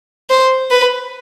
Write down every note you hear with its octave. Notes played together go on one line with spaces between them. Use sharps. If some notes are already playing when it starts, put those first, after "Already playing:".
C5
B4